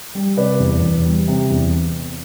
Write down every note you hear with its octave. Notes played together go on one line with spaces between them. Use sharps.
G3
C3 B4 D5
E2
E2
G3
C3
E2